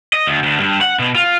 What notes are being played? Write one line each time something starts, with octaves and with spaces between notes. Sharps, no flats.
D#5
D2
D2
G2
F#5
B2
F4